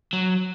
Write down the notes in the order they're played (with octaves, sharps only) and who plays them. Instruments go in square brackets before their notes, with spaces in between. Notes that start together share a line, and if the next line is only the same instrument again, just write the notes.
[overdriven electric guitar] F#3